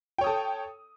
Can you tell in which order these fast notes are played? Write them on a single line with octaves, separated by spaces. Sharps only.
G5 C#5 D#6 A4